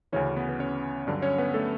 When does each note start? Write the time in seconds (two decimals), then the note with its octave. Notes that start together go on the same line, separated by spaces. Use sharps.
0.12 D2 C#3 E3 C#4 C#5
0.36 B3 B4
0.49 B4
0.59 C#4 C#5
1.07 G2 D3 F#3 D4 D5
1.22 C#4 C#5
1.38 B3 B4
1.54 A3 A4